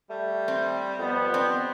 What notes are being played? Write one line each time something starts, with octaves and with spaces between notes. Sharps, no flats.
G3 A3
C4
F2 B3
C4 D4